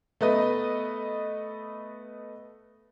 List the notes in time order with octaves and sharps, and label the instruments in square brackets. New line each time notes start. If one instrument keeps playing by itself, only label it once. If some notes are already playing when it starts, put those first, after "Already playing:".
[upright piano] A3 B3 B4 D#5